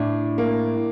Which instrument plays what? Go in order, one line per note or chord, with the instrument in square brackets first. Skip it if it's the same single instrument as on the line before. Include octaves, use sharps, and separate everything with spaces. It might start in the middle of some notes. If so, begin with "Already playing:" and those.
Already playing: [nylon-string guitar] A2 [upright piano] D4
[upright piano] A#3